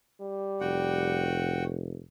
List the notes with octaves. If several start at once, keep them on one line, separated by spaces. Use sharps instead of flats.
G3
F1 F#4 F#5 G5